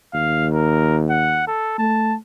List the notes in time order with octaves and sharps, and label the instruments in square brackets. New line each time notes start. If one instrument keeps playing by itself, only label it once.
[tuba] D#2 [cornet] F5
[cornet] A#4
F#5
A4
[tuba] A3 [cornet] A5